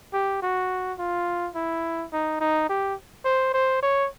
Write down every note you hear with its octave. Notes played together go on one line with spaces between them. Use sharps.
G4
F#4
F4
E4
D#4
D#4
G4
C5
C5
C#5